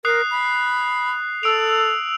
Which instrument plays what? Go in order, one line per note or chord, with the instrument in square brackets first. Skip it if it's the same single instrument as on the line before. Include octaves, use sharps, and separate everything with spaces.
[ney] A#4 [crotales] D#6 F#6 C7
[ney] B5
[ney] A4 [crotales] E6 D7 F7